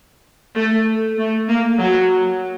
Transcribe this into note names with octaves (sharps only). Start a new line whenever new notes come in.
A3
A3
A#3
F#3